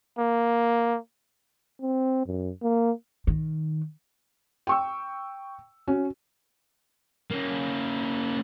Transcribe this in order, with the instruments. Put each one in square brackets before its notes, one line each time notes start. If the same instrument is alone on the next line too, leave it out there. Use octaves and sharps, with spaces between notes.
[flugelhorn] A#3
[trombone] C4
F#2
A#3
[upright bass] D#3
[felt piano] G5 C#6 E6
C#4 F#4
[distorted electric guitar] A#3 C#4